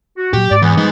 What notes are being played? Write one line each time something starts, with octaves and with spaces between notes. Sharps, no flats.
F#4
A#2 F#3 G4
G#2 D5
E2 E3 B3
F3 G3 G#3 D#4